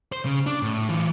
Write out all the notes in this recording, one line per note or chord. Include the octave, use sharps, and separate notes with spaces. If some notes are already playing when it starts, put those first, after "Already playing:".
C5
C#3
D4
A2
E3 F4